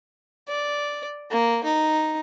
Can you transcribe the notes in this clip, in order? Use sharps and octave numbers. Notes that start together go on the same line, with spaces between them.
D5
A#3
D#4